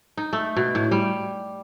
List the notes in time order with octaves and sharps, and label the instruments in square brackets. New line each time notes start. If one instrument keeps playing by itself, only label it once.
[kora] D#4
A3
B2
A2
G3